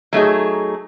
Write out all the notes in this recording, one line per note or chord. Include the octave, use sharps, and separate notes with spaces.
F#3 A3 D#4 G#4